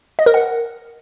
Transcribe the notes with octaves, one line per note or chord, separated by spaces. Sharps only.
D#5
A#4
F#5